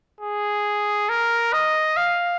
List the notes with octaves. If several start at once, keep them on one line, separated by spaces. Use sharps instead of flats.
G#4
A#4
D#5
F5